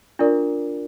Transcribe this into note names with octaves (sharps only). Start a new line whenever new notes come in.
D4 F4 A#4 D5